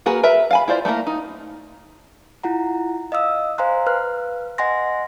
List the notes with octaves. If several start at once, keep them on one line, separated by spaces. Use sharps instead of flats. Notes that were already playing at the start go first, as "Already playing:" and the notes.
A#3 F#4 G#4 A#4 B4
A#4 B4 E5
F5 G#5 B5
E4 F4 C5 D5
A3 A#3 E4 A#4
D#4
E4 F4 F#5 A#5
D#5 F5 D#6 E6
C5 F5 G#5 A#5 C6 F#6
B4 F6 F#6
D#5 F#5 G#5 C6 A#6